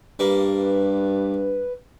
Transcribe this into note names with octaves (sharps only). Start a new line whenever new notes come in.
G2 G3 A#3 B4